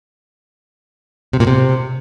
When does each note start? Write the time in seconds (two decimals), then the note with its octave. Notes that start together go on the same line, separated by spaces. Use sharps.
1.33 C3
1.40 A#2
1.47 C3